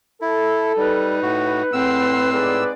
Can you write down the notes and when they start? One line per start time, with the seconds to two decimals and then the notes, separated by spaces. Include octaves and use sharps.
0.22 E4 A4
0.77 G3 D#4 B4
1.23 A2 F#4
1.73 E2 A2 C4 F#5 C6 E6
2.32 G#2 G#4 B4 D5